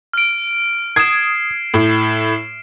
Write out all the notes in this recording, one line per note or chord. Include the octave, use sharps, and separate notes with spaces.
F6 D7
D#6 G#6 C7 E7
A2